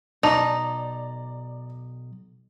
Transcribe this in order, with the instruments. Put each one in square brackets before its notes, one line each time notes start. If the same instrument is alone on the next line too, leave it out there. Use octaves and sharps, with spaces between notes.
[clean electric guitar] B1 [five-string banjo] D#4 [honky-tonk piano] D5 F7 [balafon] A5 D6